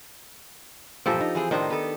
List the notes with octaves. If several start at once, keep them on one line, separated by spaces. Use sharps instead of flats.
E2 G2 A#2 F3 G4 A4
D#4
E3 C4 G#4
A2 D#3 D4 D#4 C5
B3 A4